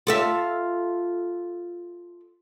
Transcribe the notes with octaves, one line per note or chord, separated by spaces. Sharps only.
F4 A4 E5